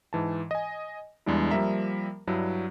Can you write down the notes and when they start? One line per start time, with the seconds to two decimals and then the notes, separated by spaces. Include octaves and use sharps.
0.13 G#2 E3 A5
0.51 D#5 G#5
1.26 E2 G3 G#3 D4 E4
1.51 F3 G3 A#3 A#4 E5 A#5
2.27 G2 F#3 D4 E4